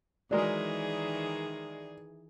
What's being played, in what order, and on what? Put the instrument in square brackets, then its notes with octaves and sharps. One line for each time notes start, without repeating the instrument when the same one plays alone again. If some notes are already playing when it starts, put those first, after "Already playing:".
[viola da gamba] D#3 E3 G#4 [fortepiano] F#3 G#3 A#4 [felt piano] D5